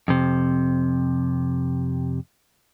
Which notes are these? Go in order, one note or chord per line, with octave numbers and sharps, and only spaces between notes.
F2 C3